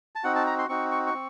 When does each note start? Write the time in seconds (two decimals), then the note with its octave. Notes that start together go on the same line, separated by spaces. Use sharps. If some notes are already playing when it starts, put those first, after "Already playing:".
0.15 A5
0.24 C4 D#4 F#4 F#5
0.35 A5
0.47 A#5
0.58 C6
0.69 C4 D#4 F#4 C#6
0.92 C#6
1.07 C#6
1.14 C4